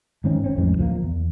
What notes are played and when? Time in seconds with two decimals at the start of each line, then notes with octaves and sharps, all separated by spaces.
0.24 G#2 D#3 C4 C#4
0.44 G#1 C4 C#4
0.57 A1 F2 E3 G#3
0.78 D1 F3 G#3 A#3
1.03 E2